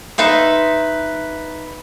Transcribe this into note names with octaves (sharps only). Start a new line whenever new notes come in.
D#4 B4 E5 C6